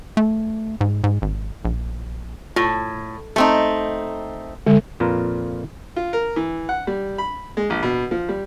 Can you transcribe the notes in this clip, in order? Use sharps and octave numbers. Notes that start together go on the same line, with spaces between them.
A3
G#2
G#2
G#1
A#1
A2 F4
A3 C4 D#4
D3 G#3
F2 A#2 F4 B4 A#5
F4
A#4
E3
F#5
G3
B5
G#3
A#1
B2
F3
G3